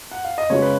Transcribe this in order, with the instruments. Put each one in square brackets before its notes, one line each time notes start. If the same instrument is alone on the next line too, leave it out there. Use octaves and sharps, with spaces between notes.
[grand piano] F#5
F5
D#5
[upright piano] C#3 G#3 B3 F4 [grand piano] C#5
[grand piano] B4